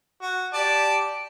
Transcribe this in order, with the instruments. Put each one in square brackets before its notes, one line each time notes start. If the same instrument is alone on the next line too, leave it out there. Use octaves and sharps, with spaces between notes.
[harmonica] F#4
G4 D5 A5